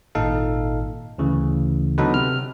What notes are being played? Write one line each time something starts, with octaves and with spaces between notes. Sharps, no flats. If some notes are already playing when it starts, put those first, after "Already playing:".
G#1 A#2 D#4 A4 F5
D2 C#3 E3
D3 F#3 B3 D#4 A4 B4
C3 F6